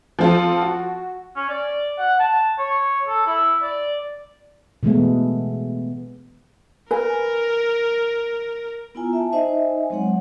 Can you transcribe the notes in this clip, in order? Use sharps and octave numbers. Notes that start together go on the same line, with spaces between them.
F3 C4 F4 A4
F#4
C#4
D5
F#5
A5
C#5
A4
E4
D5
B2 E3 G#3 A3 B3
A#4 B4 G#5
B3 E4 F4 G#5 A#5
E5 G#5 A5
D#4 C5 D#5 E5 G#5
F#3 G#3 C4 C#5 F#5